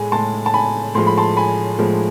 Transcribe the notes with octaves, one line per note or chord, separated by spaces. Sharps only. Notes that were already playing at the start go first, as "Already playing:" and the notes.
Already playing: A2 G#3 G#5
A2 G#3 A5 C6
A5
G#5 B5
A2 F3 G#3 C6
B5
A5 C6
G#5 B5
A2 F3 G#3